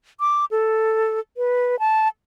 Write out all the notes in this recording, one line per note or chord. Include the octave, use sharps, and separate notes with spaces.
D6
A4
B4
A5